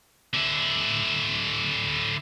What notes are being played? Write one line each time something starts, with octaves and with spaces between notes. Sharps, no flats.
D3 E4